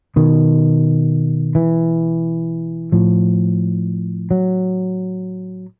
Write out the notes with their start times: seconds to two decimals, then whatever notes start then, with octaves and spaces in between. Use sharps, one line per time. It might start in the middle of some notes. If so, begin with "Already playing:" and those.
0.16 B2 D#3
1.55 E3
2.92 A2 F3
4.31 F#3